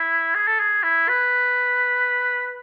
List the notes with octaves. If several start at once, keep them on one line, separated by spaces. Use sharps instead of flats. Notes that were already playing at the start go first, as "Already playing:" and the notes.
Already playing: E4
G#4
A4
G#4
E4
B4